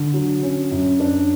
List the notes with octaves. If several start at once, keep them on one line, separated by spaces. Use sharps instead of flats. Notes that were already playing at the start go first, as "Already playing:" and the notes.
Already playing: D3
F#3
C#4
F#2
D4